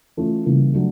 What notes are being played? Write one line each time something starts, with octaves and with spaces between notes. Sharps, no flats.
E3 A3 C#4 F4
C#3 E3 G3 A#3
F#3 A3 D4